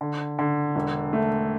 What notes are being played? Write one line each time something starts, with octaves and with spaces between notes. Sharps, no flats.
D3
D3
E1
A3